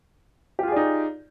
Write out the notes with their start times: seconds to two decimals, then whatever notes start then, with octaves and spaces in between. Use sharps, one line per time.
0.59 G4
0.63 F4
0.68 G#4
0.72 D5
0.76 D#4